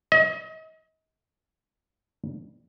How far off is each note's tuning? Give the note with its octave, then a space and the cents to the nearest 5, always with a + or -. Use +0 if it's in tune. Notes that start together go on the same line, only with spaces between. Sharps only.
D#5 +35